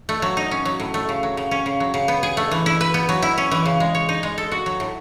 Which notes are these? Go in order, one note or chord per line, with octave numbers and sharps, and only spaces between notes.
A3
F#3
D#4
C#4
F#3
A2
A3
C#3
F#3
C#3
C#4
C#3
F#3
C#3
B3
G#4
A3
E3
E4
B4
B3
F#3
E4
C#4
E3
C#3
G#3
C#5
D#4
G#3
A4
F#4
F#3
A2